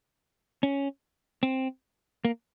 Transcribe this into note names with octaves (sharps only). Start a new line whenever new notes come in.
C#4
C4
A#3